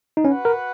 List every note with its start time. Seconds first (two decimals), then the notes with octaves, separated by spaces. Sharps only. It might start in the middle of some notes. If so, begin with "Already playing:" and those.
0.17 D#4
0.25 C#4 F#4 B4 F#5
0.45 A#4